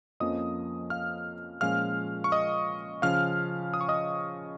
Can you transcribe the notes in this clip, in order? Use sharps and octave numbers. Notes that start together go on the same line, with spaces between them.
F2 F3 A#3 C#4 D#5 D#6
F5 F6
A#2 F3 G#3 C#4 F5 F6
C#6
D#5 D#6
C#3 F3 C#4 F5 F6
D#6
C#6
D#5 D#6